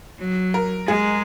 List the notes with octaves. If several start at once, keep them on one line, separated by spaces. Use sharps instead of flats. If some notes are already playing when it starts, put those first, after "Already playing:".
F#3
A#4
G#3 G#4